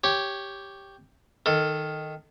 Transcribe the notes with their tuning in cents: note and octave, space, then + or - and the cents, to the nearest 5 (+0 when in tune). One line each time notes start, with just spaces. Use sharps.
G4 +0 C#5 +0
D#3 +0 A4 +20